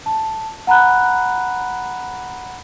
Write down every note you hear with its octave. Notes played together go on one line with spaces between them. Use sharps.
A5
F#5 A#5 B5 F#6